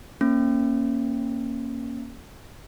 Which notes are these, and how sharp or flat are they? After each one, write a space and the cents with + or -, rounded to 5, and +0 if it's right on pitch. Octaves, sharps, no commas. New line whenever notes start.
A#3 +10 C#4 -15